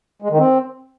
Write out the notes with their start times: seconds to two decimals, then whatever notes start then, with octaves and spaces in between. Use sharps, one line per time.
0.22 G#3
0.30 D#3
0.38 C4